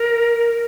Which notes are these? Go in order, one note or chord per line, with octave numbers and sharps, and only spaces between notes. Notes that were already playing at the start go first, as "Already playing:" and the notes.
Already playing: A#4